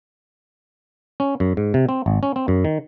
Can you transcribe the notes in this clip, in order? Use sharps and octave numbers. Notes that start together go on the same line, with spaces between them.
C#4
F#2
G#2
C3
C4
G#1
C#4
C4
F#2
D#3